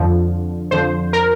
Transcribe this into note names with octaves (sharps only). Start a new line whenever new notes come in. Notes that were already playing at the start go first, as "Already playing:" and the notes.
Already playing: F2 D3 F3
F2 D3 F3 C5
A#4